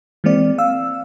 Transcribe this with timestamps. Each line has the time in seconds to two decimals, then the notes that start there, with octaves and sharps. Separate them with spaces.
0.24 E3 G#3 A#3 C4 D5
0.58 F5 E6